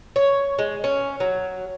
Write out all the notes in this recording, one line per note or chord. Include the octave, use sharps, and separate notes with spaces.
C#5
G#3
C#4
F#3